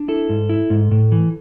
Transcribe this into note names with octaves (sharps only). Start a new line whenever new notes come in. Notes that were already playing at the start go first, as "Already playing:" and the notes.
Already playing: D4
E4 A4
G#2
E4
G#2
A2
E3